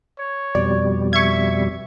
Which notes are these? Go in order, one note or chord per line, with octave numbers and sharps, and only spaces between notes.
C#5
F2 B2 G3 D5
E5 C#6 G#6